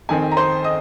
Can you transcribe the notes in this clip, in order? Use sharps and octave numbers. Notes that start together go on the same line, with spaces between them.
F2 D#3 C4 G#5
A#5
C5 C6
D#5 D#6